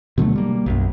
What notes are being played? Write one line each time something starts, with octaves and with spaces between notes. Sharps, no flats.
B2 D3 F#3 A3
G3 A#3
B1 F#2